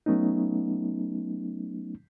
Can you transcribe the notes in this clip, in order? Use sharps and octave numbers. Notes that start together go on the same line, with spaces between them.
F#3 A3 B3 C#4 D#4